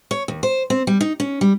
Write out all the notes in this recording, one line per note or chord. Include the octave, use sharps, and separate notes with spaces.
C#5
D#2
C5
C4
G3
D#4
C#4
G3